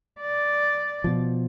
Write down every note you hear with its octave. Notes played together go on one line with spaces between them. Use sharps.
D5
B2 F3